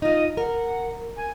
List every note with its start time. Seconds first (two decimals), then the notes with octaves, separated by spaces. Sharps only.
0.02 D#4 F4 D#5
0.37 A#4 F#5
1.17 G#5